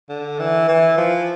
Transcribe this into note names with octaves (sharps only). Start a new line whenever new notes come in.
D3
E3
E3
F3